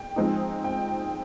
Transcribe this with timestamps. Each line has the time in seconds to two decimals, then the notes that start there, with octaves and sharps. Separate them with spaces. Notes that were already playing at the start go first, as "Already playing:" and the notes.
Already playing: G5
0.16 F3 G#3 C4 D#4
0.64 G5